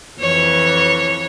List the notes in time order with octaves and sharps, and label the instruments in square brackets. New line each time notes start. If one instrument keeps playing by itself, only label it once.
[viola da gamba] F2 E3 C#5